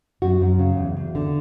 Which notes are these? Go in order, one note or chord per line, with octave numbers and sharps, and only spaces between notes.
F#2 F#4
F#2
C#3
E2
E2
D3